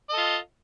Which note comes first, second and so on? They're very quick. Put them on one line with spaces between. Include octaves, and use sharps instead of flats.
D#5 A4 F4